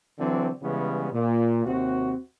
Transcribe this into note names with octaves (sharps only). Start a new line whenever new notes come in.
D3 E3 F#3 C4
C#3 E3 G3 G#3 B3 C#4
A#2
D#2 C3 C4 F#4